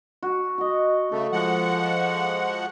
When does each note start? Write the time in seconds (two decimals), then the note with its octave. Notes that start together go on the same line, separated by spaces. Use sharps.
0.23 F#4
0.58 F#4 D#5
1.12 C#3 A3 A4
1.32 F3 G#3 F#5